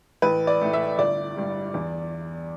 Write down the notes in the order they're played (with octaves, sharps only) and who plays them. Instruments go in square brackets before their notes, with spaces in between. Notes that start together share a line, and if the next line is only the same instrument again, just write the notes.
[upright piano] A1 B4
D5
A2 A3
E5
G1 D5
G2 G3
E2